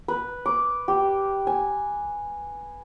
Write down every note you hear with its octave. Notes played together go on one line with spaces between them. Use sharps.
B4
D6
G4
G#5